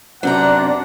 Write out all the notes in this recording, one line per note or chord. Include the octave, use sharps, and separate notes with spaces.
F#2 C3 C4 D4 F#5 A#5